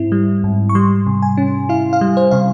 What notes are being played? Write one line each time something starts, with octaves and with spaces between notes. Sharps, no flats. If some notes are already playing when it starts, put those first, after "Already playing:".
Already playing: G#2 C4 E4
G3
G#2
C#6
G3 C6
C3
G#5
C#4
E4 F5
F5
G3
C5
C3 F5